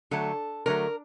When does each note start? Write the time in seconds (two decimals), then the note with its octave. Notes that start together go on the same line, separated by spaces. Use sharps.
0.11 D3 F#3 A3 A4
0.66 D3 F#3 A3 A#4